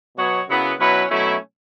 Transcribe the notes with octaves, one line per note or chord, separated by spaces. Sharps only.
B2 F#3 B3 F#4 C#5
F#2 C#3 F#3 B3 E4
B2 F#3 C#4 E4 B4
B2 F#3 A3 C#4 E4